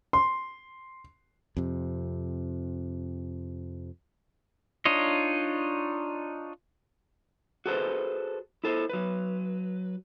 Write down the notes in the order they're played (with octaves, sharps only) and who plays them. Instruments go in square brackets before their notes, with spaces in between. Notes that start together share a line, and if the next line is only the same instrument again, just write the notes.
[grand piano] C6
[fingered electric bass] F2 C3
[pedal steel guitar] D4 D#4 F4 C#5 D#5
[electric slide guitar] F#4 G#4 A4 B4 C5
E4 A4 C5
F#3 B4